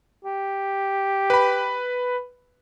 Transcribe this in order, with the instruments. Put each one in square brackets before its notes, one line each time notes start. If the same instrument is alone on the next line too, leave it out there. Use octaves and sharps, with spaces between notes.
[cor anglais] G4
[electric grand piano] B4 B5